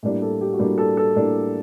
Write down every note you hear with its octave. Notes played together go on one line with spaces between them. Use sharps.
A2 G3 A#3 D4
A4
G4
F#4
A2 G3 A#3 D4 G4
A4
A4
A2 G3 A#3 D4